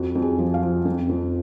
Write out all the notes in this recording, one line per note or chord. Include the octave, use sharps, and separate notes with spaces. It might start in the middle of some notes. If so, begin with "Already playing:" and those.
Already playing: F2 F#4
F2
G#4
F3
F5
F3
F2
F2